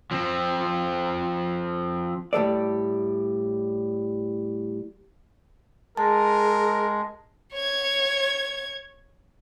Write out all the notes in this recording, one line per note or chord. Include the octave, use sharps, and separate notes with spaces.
F3 C4
A2 G3 A4 D5
G#3 G#4 A#4 A5
C#5 G#6